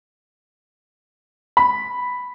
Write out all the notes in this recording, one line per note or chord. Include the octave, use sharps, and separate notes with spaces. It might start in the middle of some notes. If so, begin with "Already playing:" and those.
B5